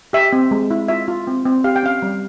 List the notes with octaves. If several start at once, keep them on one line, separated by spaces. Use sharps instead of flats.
G4 E5
C4
G#3
E4
F4 E5
F4
C4
C4
G4 F5
G5
C#4 F5
G3